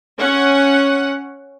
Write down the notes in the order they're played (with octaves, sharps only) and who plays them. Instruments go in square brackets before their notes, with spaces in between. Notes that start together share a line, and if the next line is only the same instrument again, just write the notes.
[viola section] C#4 F#5